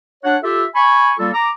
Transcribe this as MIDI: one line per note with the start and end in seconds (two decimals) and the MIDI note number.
0.24 0.36 62
0.24 0.36 73
0.24 0.36 78
0.43 0.63 65
0.43 0.63 67
0.43 0.63 69
0.43 0.63 76
0.75 1.12 80
0.75 1.12 83
0.75 1.12 85
1.19 1.30 55
1.19 1.30 58
1.19 1.30 65
1.19 1.30 69
1.34 1.50 82
1.34 1.50 86